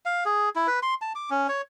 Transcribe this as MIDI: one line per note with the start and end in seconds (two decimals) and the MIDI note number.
0.05 0.24 77
0.25 0.49 68
0.56 0.67 64
0.67 0.80 71
0.83 0.94 84
1.02 1.12 81
1.15 1.30 86
1.30 1.47 61
1.49 1.62 73